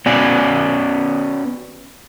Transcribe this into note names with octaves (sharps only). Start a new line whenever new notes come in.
B3 C#4 F#4 D5 G#5